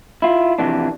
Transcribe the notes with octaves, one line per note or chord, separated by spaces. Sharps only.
E4 F4
F2 C3 E3 D4